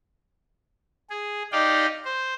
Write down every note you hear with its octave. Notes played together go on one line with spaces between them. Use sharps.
G#4
D#4 G4 D5 D#5 F5 G5
C5